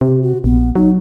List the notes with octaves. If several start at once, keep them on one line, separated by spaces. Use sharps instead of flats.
C3 G4
F#4
A#1 B3
F#3 D#4